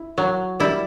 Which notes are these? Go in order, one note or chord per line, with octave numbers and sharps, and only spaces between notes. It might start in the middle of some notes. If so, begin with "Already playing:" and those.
Already playing: E4
F#3
G3 E4